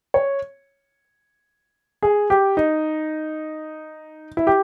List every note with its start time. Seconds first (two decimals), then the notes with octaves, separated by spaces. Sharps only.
0.14 C#5
2.03 G#4
2.30 G4
2.57 D#4
4.37 E4
4.47 G4